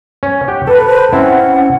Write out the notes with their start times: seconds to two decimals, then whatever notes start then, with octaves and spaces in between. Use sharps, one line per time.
0.23 C#4
0.48 G4 F#5 G5
0.67 A4 B4
0.86 B4 C5 A5
1.13 C4 C#4 E4 F#5